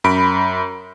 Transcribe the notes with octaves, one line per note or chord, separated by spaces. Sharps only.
F#2 B5 D7